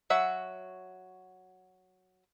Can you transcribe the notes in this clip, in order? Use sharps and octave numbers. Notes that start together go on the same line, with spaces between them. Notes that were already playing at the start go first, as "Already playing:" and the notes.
F#3 F#4 E5